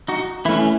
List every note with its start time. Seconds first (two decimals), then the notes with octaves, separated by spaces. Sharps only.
0.08 D#4 F#4
0.45 E3 E4
0.48 A3 C#4